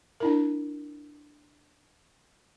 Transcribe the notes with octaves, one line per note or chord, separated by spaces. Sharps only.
D4 E4 A#4